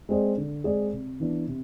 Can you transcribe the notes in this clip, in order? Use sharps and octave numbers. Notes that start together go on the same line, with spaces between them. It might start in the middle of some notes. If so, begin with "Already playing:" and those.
G#3 C4 G#4 D5
D3
G#3 C4 G#4 D5
C3
E3 B3 D4
C3